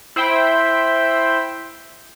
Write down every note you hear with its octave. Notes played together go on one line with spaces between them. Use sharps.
E4 C5 E5 G5 B5